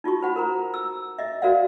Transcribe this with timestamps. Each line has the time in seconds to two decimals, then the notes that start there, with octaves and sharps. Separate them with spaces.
0.04 D#4 F4 F#4 C#6
0.21 F4 C5 F#5 B5
0.36 A#4 C5 A#5
0.74 E6
1.19 D#5 E5
1.42 F#4 A#4 C5 D5 F5 F#5